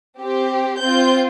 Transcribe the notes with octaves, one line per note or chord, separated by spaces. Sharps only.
C4 G4
C4 F4 G6